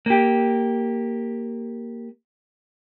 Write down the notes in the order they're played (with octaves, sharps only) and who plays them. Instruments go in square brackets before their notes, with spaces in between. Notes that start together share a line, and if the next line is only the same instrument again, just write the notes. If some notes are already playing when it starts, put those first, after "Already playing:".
[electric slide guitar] A#3 G4